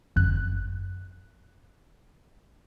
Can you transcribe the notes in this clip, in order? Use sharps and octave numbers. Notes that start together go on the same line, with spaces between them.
G1 F#2 F#6